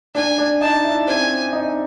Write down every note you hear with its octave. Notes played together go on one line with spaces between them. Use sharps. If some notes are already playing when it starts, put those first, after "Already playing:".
D4 G#5
D4
D#4 A5
E4
C4 G#5
D#4